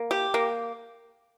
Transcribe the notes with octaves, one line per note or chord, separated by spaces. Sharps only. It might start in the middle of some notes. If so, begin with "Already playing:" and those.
Already playing: A#3
G4
A#3